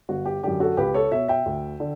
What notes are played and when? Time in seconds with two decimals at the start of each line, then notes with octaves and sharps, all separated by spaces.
0.09 G1 F#4
0.26 G4
0.43 F#2 D3 G4
0.60 F#4 A4
0.77 C#2 G4 B4
0.94 A4 C#5
1.11 B2 C#5 E5
1.28 E5 G5
1.46 D2
1.80 D3